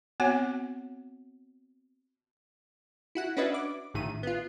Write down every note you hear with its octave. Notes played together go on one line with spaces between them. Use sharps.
B3 C4 F#4 C#5 F#5 G#5
E4 F#4 F#5
C#4 D4 F#4 B4 D#5 E5
D6
A#1 A2 D#3 D#7
B3 F4